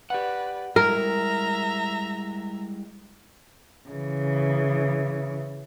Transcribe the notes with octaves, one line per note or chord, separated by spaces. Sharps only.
G4 B4 D5 F#5
G3 G#3 E4 A#4 E5 A#5
C#3 E3